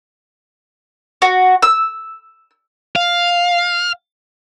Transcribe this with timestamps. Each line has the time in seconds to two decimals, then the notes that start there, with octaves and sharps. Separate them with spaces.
1.22 F#4
1.62 E6
2.96 F5